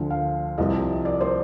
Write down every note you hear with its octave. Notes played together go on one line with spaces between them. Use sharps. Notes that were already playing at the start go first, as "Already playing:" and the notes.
Already playing: D2 D3 F3
F5
C2 C3 F3 D#5
D5
C5